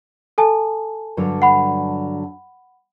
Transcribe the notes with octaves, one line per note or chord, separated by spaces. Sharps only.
A4 G#5 A5
G2 D3 F#3
F#5 B5